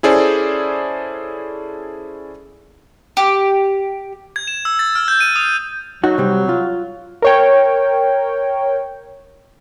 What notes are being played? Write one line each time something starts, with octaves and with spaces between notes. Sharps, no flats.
C#4 E4 G#4 A4 C5 D5
G4
G#6
E7
E6
A6
F6
G6
D#7
D#6
F#3 D#4 F#4
C3 G3
F4
A#4 C#5 G5